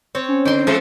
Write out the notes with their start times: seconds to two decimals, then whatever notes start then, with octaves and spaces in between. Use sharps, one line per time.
0.15 C4 C#5
0.28 C#4
0.45 D3 G5 C6
0.67 F3 G#3 A4 C5